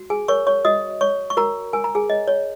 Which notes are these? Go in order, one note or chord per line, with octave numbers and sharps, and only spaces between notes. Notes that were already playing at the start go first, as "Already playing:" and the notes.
Already playing: F#4
G#4 G#5
A#4 C#5 C#6
C#5 C#6
F#4 D#5 D#6
C#5 C#6
C#6
F#4 A#4 A#5
A#4 G#5
A#5
G#4 G#5
C#5 D#5
C#5